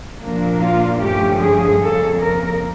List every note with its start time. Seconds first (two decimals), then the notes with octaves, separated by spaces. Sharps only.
0.22 A#2 F3 A#3 D4
0.62 F4
1.01 G2 D3 F3 A3 C#4 G4
1.41 G#4
1.82 F2 C#3 F3 A#3 A4
2.22 A#4